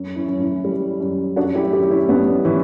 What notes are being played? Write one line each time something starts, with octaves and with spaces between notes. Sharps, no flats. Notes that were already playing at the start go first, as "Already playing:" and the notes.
Already playing: F#2
C#4 E4
F#2
C#4 E4
G3
F#2
F#2 D4 F#4
E4 G4
F#2 E4 G4
C#4 E4
F#2 B3 D4
E3 C#4 E4